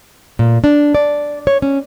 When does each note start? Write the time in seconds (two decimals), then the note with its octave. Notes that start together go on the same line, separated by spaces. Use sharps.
0.39 A#2
0.64 D4
0.95 D5
1.47 C#5
1.62 C#4